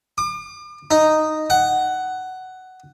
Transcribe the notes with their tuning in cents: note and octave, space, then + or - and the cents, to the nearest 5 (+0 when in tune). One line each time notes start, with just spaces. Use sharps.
D6 +40
D#4 -5
F#5 +10